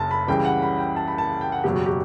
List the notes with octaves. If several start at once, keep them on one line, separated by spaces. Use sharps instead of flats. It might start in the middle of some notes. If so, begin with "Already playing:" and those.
Already playing: F#1 F#2 A5
B5
C#2 C#3 E3 G3 G5
F#5
B5
G5
A5
B5
A5
G5
F#5
F#1 E2 B2 F#3 G4
F#4
G4